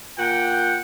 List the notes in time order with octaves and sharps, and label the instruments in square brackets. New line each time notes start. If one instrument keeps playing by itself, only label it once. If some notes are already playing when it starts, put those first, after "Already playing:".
[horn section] A#2 F#5 G5